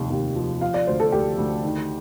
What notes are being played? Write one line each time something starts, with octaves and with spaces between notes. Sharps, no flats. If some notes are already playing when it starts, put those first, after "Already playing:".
Already playing: F1 D#2
D#2
F3
F3 F5
D5
D2 C5
A4
D2 G4
D2
D#3